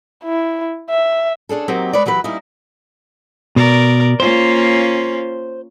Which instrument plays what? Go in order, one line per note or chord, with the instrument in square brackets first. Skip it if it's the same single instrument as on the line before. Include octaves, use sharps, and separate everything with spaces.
[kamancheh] E4
E5
[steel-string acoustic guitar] C#4 D4 G#4 A4
F#3 A#3 C4 D#4 G4
G#3 B4 C#5 D5
E3 F#3 G4 B4
G3 A#3 C#4 D#4 E4
[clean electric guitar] B2 [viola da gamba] A#4 D5
[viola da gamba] A#3 C#4 F4 [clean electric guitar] C5